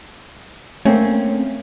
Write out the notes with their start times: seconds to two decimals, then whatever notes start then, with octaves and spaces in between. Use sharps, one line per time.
0.85 A3 A#3 C4 C#4